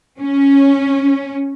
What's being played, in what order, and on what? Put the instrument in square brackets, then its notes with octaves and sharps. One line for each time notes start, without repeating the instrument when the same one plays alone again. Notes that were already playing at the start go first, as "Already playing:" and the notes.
[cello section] C#4